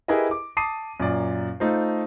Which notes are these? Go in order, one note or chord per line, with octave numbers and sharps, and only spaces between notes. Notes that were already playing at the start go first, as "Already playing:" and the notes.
E4 G4 G#4 A#4 B4 D#5
D6
A5 D6 D#6 C7 D#7
F#2 A#2 D5
A3 D#4 F4 C5